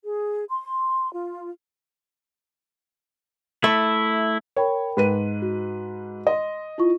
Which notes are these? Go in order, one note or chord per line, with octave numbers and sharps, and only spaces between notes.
G#4
C6
F4
A3 E4
A#4 C#5 G5 B5
G#2 B4 D#7
F#4
D#5 C6
E4 F4 C#6